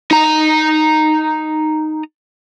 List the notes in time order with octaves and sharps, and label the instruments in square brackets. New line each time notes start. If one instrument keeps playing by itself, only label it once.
[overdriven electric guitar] D#4 A#5